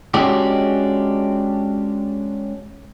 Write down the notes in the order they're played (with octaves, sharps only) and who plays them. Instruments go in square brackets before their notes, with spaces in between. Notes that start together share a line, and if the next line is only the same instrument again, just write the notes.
[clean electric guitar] G#3 C#4 D4 F#4 G4